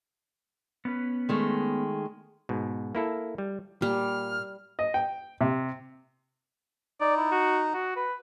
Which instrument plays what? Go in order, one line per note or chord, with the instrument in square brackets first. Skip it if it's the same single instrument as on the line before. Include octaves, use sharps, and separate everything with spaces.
[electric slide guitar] B3 C#4 B4
[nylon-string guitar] D#3 G#3 A3
[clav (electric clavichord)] G#2 B2
A#3 E4 A4
G3
[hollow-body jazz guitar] A#2 [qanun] G3 [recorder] F6
[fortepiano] D#5
G5
C3
[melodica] D#4 [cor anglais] D5
[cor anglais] E4
F#4
F#4
B4